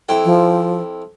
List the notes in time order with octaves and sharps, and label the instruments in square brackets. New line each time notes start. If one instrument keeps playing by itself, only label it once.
[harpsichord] F2 E4 G5
[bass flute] F3